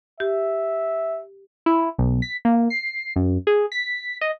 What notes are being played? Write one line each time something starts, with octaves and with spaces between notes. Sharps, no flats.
G4 E5
E4
B1
B6
A#3
C7
F#2
G#4
B6
D#5